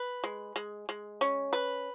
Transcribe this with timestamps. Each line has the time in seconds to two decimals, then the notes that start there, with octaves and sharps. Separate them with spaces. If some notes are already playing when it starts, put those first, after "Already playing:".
Already playing: B4
0.24 G#3
0.56 G#3
0.89 G#3
1.21 C#4
1.53 B4